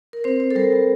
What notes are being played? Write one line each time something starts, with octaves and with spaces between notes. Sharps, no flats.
A#4
C4 C5
C4
A4
G3 A#4
G3